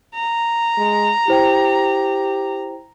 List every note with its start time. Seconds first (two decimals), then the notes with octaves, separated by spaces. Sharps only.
0.14 A#5
0.78 G#3
1.28 E4 G4 C5 G5